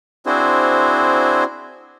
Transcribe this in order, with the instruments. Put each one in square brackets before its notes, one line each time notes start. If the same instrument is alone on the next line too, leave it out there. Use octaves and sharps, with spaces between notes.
[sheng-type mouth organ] C4 D4 E4 F#4 G#4 C5